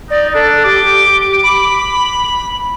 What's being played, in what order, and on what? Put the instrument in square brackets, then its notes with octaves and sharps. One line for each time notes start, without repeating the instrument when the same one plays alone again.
[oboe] D#4 [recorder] D5
[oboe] D4 [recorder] A4
[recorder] G4 [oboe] D6
[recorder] B5